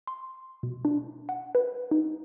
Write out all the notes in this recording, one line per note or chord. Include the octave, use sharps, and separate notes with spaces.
C6
B2
D4
F#5
B4
D#4